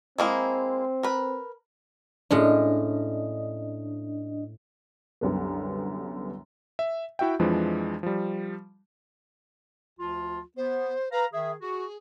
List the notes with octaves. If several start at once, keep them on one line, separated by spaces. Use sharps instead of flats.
G#3 A#3 C4 E4
A#4 B4
A2 G#3 C#4 D4 D#5
C2 F#2 D3 B3
E5
E4 F#4 E5 G5
F2 E3 F3 G#3 D4
F3 G3
D2 F3 F4
B3 C5
B4 F5 A#5
D#3 G#4 E5
F#4 G#4